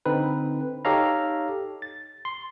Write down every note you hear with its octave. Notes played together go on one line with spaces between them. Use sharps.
D3 C4 D#4 B4
D#4 G4 A4 C#5 F5 A#5
A6
C6